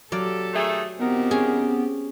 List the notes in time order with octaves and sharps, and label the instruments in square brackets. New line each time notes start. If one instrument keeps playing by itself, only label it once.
[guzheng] F#3 D5 F5 [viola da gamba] G4 A4
[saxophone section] D#3 A3 G#4
[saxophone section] A#2 D#3 A#4 [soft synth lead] B3 [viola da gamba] C4 G4
[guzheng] C#4 G#4